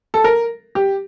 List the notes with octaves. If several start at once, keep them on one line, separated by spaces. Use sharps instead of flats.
A4
A#4
G4